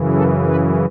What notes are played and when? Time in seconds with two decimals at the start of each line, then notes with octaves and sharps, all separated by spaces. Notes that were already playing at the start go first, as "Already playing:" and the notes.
Already playing: F#2 C#3 E3
0.13 A4
0.46 B4